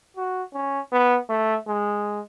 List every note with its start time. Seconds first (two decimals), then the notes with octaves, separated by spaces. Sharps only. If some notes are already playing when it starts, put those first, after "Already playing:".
0.17 F#4
0.54 C#4
0.92 B3
1.30 A3
1.68 G#3